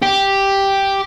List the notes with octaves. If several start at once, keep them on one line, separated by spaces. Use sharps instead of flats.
G4